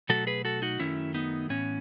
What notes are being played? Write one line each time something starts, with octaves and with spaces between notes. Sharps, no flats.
B2 F#3 A3 F#4 A4
G#4 B4
F#4 A4
D#4 F#4
F#2 D#3 F#3 A3 C#4 E4
B3 D#4
A2 E3 B3 C#4